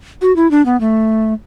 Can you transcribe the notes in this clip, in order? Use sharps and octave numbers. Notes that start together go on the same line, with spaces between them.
F#4
E4
D4
B3
A3